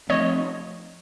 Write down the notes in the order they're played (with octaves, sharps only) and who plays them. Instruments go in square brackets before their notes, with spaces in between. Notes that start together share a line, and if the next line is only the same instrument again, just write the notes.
[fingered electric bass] F3 A3 C4 [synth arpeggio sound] C#5 D#5